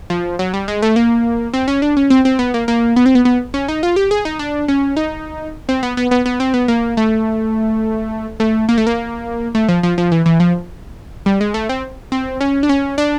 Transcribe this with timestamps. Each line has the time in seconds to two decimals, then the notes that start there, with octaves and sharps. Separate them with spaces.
0.10 F3
0.39 F#3
0.54 G3
0.68 G#3
0.82 A3
0.96 A#3
1.54 C4
1.68 C#4
1.82 D4
1.97 C#4
2.10 C4
2.25 C4
2.39 B3
2.54 A#3
2.68 A#3
2.96 B3
3.06 C4
3.15 B3
3.25 B3
3.54 C#4
3.68 D#4
3.83 F4
3.96 G4
4.11 G#4
4.25 D#4
4.39 D4
4.68 C#4
4.97 D#4
5.69 C4
5.83 B3
5.97 B3
6.11 B3
6.26 B3
6.40 C4
6.54 B3
6.68 A#3
6.97 A3
8.40 A3
8.69 A#3
8.78 A3
8.87 A#3
9.55 A3
9.69 F3
9.83 F3
9.98 F3
10.12 E3
10.26 E3
10.40 F3
11.26 G3
11.41 G#3
11.54 A3
11.69 C4
12.12 C4
12.41 C#4
12.63 D4
12.69 C#4
12.98 D4